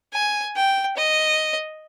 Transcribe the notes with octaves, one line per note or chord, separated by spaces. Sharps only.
G#5
G5
D#5